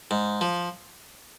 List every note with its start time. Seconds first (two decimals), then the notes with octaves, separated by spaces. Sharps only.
0.11 G#2
0.41 F3